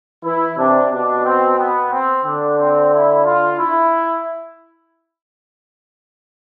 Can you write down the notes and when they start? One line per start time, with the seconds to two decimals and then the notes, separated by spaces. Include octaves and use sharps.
0.24 E3 E4
0.58 C3 D4
0.91 B2 D4
1.25 C4
1.58 B3
1.91 C4
2.25 D3 D4
2.59 C4
2.93 E4
3.25 F4
3.59 E4